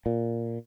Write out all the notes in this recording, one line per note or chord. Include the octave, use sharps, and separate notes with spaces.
A#2